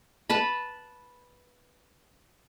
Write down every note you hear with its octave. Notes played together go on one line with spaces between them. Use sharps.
B4 A5 B5